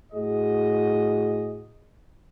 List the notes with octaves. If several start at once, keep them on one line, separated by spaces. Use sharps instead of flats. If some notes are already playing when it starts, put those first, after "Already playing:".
A2 F#4 G#4 D#5